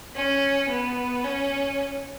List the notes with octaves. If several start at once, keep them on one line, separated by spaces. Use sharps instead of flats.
C#4
B3
C#4